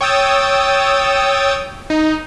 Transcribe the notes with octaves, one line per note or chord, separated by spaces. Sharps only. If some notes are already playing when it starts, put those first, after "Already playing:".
C#5 G5 D#6 E6 A6
D#4